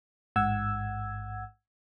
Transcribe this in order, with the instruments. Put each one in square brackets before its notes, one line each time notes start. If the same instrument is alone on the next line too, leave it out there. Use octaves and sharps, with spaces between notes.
[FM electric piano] A1 G#2 F#5 E6 G#6